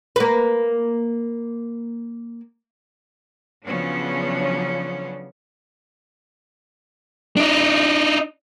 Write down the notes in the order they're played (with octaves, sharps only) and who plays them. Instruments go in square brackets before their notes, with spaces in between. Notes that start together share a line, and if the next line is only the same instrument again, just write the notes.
[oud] A#3 B4
[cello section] C#3 F3 F#3 B3 C#4 D4
[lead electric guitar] D4 D#4